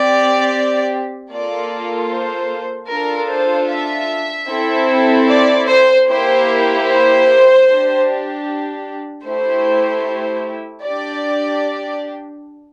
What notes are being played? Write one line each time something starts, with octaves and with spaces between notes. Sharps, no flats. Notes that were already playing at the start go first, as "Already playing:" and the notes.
Already playing: C4 G4 D5
A#3 F4 A4 D5
C5
D4 F4 A4 A#4
C5
E5
C4 E4 A4
D5
C5
A#3 E4 G4 C5
C5
D4 G4
A3 E4 G4 C5
D4 G4 D5